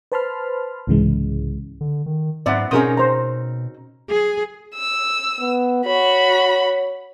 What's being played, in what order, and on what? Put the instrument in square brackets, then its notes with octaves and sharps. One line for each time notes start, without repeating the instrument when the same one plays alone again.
[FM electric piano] B4 C5 A5 B5 C6 F6
C2 G#2 C#3 E3 G#3
[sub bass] D3
D#3
[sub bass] G#2 [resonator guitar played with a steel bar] F#3 B3 C4 [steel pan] D5 E5 F#5
[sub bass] B2 [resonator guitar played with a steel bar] C4 C#4 D#4 [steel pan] G#4 A#4 D#6
[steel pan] C5 A#5
[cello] G#4
[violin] E6
[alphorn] B3
[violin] F#4 B5 [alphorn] C#5